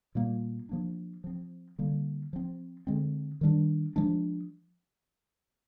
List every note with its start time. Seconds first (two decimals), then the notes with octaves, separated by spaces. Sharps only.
0.15 A#2 G3 A#3
0.69 F3 A#3 D4
1.24 F3 C4
1.79 D3 G3 A#3
2.33 F3 C4
2.87 D3 G#3 C4
3.41 D#3 G3 D4
3.96 F3 G#3 D4